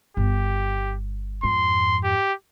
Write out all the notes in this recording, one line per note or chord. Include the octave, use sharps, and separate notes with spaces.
G1 G4
F2 G#2 C6
G4